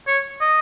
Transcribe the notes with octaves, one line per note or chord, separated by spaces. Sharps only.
C#5
D#5